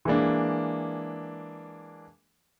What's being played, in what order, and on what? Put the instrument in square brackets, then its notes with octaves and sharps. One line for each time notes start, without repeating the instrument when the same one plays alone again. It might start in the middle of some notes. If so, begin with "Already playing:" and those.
[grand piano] E3 G#3 A#3 D4